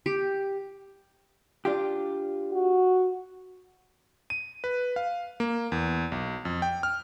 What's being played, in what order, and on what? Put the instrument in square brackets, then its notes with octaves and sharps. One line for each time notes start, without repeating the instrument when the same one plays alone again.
[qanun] G4
[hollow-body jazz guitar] D4 F4 G4
[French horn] F#4
[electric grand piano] D#7
B4
F5
A#3
E2
B1
F2
G5
F6